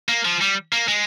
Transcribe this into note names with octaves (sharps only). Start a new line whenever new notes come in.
A#3
F3
G3
A#3
G#3